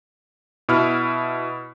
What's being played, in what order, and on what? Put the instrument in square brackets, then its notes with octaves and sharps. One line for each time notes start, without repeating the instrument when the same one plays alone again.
[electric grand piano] B2 E4 F6